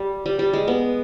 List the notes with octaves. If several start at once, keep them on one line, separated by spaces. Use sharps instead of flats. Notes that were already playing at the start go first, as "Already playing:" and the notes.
Already playing: G3
G3
G3
G#3
B3